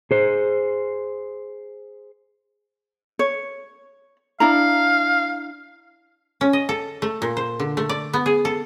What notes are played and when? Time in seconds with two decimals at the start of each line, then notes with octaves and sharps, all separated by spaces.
0.11 G#4 C5
3.19 C#5
4.40 D4 E4 F5 A#5
6.41 C#4
6.53 D#5
6.69 A4
7.02 A3
7.22 A#2
7.37 C5
7.60 D3
7.77 A3
7.89 D5
8.13 B3
8.26 G#4
8.45 A4